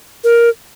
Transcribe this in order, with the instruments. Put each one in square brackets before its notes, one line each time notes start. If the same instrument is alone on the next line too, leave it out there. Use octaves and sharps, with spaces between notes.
[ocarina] A#4